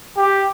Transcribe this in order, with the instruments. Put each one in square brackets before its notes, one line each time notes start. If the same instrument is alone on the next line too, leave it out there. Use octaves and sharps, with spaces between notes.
[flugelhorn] G4